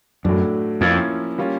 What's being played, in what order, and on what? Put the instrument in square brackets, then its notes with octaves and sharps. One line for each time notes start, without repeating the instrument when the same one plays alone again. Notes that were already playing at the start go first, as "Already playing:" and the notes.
[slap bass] F#2 [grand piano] A2 F#3 A3 D4
[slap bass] F2 [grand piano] F3 A#3 C#4 E4
[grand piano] G3 A#3 C#4 F4